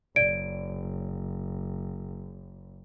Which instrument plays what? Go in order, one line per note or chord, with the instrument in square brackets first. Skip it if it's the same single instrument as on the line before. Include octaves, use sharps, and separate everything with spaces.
[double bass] F#1 [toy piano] D5 [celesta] D7